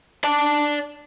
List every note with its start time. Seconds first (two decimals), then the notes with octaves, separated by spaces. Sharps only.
0.24 D5 A5